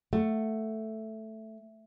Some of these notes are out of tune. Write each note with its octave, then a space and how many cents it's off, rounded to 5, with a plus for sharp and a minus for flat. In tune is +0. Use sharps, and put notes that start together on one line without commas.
A3 +0 F#5 +0